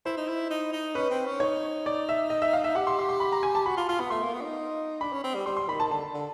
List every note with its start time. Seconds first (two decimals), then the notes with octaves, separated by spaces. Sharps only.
0.05 E4 C5
0.17 D#4
0.28 E4
0.50 D#4
0.72 D#4
0.95 C#4 B4
1.10 C4
1.26 C#4
1.40 D#4 C#5
1.86 D5
2.09 E5
2.30 D#5
2.42 E5
2.53 F5
2.64 E5
2.75 G4 F#5
2.87 C6
2.99 C6
3.09 C6
3.20 B5
3.32 A#5
3.43 G#5
3.55 A5
3.66 F#4 B5
3.77 F4 C6
3.89 F4 C6
3.99 B3 B5
4.10 A3 C6
4.22 A#3
4.34 B3
4.41 D4
4.45 D#4
5.01 D4 B5
5.13 C#4
5.24 C4
5.35 G3
5.46 G3 C6
5.57 C6
5.68 D#3 B5
5.80 A5
5.91 D3 A5
6.14 D3